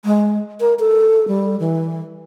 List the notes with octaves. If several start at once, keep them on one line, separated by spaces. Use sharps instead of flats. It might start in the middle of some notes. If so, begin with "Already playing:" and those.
G#3
A#4
A4
G3
E3